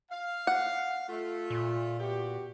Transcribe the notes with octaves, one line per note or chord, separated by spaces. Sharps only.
F5
F#5
A3 F4
A#2
B3 F#4 G4